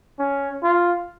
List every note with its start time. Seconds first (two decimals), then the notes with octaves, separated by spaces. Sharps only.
0.19 C#4
0.63 F4